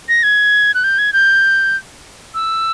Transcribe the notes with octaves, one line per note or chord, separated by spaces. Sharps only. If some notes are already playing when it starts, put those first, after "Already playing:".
A#6
G#6
F#6
G6
G#6
G6
E6